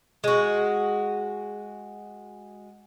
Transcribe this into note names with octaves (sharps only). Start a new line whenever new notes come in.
G#3 F#4